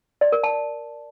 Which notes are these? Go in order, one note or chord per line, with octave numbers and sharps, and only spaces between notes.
D5
A#4
A5